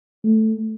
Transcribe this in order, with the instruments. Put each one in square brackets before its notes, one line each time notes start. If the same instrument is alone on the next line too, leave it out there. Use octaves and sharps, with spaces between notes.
[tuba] A3